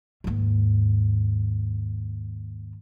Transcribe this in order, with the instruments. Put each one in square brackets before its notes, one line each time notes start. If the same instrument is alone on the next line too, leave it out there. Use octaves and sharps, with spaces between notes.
[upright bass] D#2 G#2